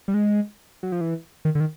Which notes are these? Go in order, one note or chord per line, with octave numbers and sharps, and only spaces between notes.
G3
G#3
F#3
F3
E3
D#3
D3
D#3